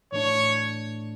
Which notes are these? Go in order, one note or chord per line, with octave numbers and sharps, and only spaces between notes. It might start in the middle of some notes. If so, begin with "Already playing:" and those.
A2 E3 A3 D4 C#5